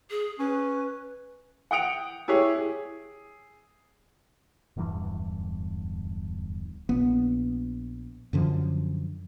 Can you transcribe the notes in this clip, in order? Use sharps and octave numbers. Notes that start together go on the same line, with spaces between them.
G#4
C#4 B4
F#5 G5 D#6 C#7 D7 F7
E4 G4 G#4 C#5
G#4
D1 E2 G2 E3
A#1 B3
F#2 D3 F3